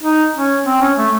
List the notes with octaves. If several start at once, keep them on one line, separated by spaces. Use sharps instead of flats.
D#4
C#4
C4
C#4
A3